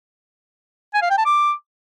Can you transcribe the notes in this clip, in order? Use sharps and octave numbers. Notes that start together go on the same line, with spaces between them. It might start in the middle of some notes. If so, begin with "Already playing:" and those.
G#5
F5
G5
A5
D6